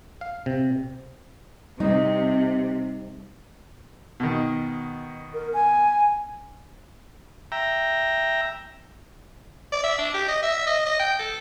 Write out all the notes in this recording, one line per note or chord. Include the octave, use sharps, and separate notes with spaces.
F5
C3
C3 G3 D#4
B2 D#3
A#4
G#5
E5 G5 A#5
D5
E5
D4
G4
D#5
E5
D#5
D#5
G5
A4